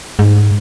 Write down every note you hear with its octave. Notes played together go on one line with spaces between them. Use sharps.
G#2